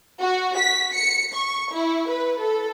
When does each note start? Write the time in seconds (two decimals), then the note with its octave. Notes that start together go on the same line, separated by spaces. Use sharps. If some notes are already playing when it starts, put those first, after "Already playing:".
0.21 F#4
0.58 B6
0.94 C#7
1.34 C#6
1.73 E4
2.09 B4
2.40 A4